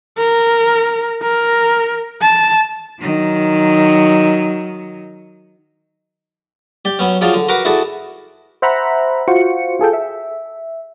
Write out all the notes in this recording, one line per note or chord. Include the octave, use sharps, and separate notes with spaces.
A#4
A#4
A5
D#3 F#3
G4 D5 G5
F#3 B3 C#4
F3 F#3 F4 G#4 D5
D3
F#4 A#4 B4 A#5 C#6 D6
E4 F#4 G#4 A4 D5
C5 E5 F#5 A#5 B5
F4 F#4 C5 C#7
F4 G#4 A4 G5
E5